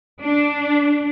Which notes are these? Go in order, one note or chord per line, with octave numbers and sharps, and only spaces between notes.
D4